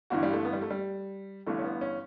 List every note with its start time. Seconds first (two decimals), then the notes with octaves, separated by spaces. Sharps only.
0.10 G1 G2 E3 F#4
0.23 G3
0.33 A3
0.45 B3
0.53 G3
0.62 A3
0.71 G3
1.47 G1 G2 E3 A3
1.59 C#4
1.64 B3
1.81 C#4